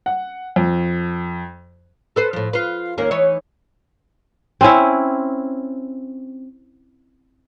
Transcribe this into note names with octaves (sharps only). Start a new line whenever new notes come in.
F#5
F2
A4 B4 C5
A2 F3
F4 B4
D#2 A#3 C#4
E3 D#4 C#5
C4 C#4 E4